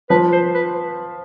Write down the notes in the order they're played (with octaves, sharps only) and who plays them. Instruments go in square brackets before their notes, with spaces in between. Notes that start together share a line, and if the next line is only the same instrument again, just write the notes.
[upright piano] F3 [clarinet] B4
[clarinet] C5
B4